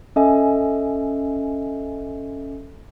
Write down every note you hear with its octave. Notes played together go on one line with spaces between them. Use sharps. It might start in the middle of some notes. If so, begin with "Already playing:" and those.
C#4 A4 D#5 E5 G#5